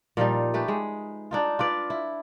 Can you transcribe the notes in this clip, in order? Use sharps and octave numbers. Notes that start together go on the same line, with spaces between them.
A#2 F3 G3 D#4
A3 G4 B4
G#3
D4 D#4 F4
F4 B4 D5
E4